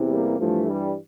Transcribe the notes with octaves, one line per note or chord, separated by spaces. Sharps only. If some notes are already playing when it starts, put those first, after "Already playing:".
Already playing: E2 C3 E3
G3 A#3
G2 E3 F3 A3
G3